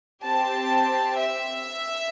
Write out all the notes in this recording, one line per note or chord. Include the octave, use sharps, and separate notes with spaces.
C4 G4 A5
E5